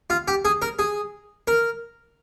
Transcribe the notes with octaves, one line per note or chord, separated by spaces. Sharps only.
F4
G4
G#4
A#4
G#4
A#4